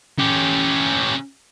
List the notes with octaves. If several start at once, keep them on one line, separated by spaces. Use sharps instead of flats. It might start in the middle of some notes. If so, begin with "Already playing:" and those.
C#4 G4